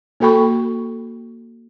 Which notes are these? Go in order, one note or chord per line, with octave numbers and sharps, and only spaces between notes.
A#3 F#4 A4 G5 B5 C#6